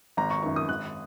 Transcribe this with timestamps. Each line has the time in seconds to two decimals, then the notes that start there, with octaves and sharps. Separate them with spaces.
0.17 G#1 A#5
0.31 C#6
0.43 F#2 D#3 C#6
0.56 D#6
0.69 G#1 F#6